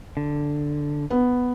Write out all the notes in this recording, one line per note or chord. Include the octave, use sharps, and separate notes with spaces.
D3
B3